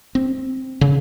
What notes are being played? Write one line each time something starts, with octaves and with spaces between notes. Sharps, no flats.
C4
C#3